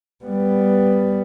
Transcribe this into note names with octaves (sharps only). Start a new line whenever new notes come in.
G3 B3